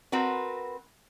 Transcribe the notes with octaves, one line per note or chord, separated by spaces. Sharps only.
C4 F#4 A#4 B4